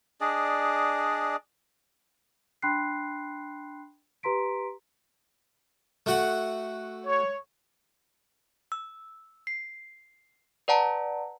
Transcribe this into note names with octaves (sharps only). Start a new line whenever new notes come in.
D4 G#4 D5 D#5
D4 G5 B5 C6 F#6 C7
G4 B4 A#5 C6 B6 D7
A3 F#4 F#5
C#5
E6
C7
B4 D5 F#5 A5 A#5